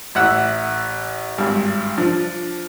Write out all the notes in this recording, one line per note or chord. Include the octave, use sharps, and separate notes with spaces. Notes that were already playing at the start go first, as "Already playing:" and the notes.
A1 E5 F#5 E6
G#1 G2
F3 D4